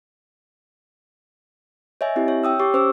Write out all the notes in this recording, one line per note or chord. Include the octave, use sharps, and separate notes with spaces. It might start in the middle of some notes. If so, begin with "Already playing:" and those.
C#5 D#5 E5 G#5
C4 E4 G4 E5
C#5
G5 D#6 E6
G4 C#5 C#6 D6
C#4 C5 C#6 D6 E6